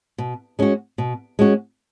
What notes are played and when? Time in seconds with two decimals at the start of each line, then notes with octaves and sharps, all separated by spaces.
0.18 B2
0.59 G#3 C#4 F#4
0.98 B2
1.39 G#3 C#4 F#4